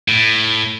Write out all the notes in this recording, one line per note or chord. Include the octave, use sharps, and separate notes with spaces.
A2